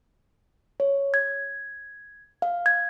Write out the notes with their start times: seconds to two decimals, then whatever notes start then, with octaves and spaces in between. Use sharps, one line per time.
0.80 C#5
1.14 G#6
2.42 F5
2.66 G#6